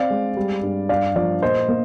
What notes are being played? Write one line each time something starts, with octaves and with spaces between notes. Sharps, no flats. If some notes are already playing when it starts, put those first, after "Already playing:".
Already playing: C4 D5 F5
G#3
G3
G2
G2 D5 F5
F3 D5 F5
A#2 C5 D#5
A#3